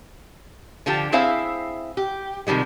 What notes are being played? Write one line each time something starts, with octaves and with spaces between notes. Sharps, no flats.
D3 F3 F4 G4 A5
C4 E4 G#4 C5 E5 F5
G4
C3 D#3 F3 G3 G#3